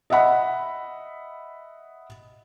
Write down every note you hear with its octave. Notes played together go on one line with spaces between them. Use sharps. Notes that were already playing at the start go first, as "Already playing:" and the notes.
D#5 E5 F#5 B5